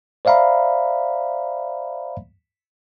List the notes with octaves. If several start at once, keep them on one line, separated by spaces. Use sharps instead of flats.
C5 D5 E5 F5 A#5 B5